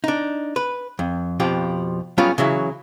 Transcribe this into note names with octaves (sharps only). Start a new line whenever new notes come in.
D4 D#4
B4
F2
F2 B2 F3 G4
F#3 G3 B3 C#4 F4 G#4
C#3 E3 F#3 E4